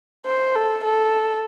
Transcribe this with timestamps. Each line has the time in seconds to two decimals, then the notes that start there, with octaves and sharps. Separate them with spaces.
0.26 C5
0.55 A4
0.84 A4